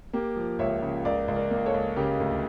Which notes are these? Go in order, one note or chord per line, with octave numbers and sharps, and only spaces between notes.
A#3 G4
F3
C#2 C#5 E5
C#3
C#2 A#4 D5
C#2
A#4 D5
A#3
A4 C#5
C#2
C#3 G4 A#4
D2